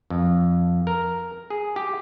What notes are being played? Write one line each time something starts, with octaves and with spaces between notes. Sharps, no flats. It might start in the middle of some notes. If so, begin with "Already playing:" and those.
F2
A#4
G#4
G4